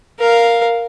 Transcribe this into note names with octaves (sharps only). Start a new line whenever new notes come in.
A#4 F5